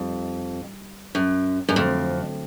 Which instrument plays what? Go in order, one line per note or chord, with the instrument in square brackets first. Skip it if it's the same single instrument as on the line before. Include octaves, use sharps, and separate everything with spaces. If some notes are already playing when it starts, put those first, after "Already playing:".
Already playing: [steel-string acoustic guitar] F2 [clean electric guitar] G3 D#4
[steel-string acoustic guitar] F#2
F#2
[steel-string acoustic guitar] F2 [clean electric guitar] D3 F#3 A3 C4